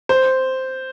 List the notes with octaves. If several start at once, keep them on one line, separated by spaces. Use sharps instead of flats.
C5